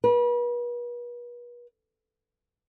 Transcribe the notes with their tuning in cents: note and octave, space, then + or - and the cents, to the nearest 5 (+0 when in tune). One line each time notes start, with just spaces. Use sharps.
B4 -40